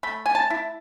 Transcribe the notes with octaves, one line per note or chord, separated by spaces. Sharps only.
A3 B5
G#5
A5
E4